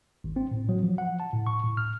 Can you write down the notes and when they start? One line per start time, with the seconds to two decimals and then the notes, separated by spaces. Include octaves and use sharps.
0.24 G#1
0.36 C4
0.51 A2
0.69 F#3
0.83 F3
0.98 F#5
1.20 A5
1.33 A2
1.47 C#6
1.64 A2
1.77 F6